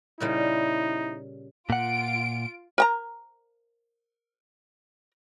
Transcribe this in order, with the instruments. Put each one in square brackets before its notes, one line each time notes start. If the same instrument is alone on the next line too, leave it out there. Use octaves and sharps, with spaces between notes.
[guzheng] A#2 C#3 G3 [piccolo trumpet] D#4 [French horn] E4
[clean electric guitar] A#2 F#5 [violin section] F4 D7
[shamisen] A#4 G5 A#5